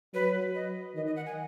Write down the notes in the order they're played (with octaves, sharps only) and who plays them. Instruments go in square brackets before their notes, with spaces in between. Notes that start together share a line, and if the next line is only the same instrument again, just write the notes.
[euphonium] F#3 [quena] B4
[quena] D#5
[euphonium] D#3 [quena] D#5
[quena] D#5
F#5
G#5